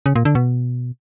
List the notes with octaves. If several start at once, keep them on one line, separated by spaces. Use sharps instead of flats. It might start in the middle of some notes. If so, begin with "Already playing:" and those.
C#3
A#2
D3
B2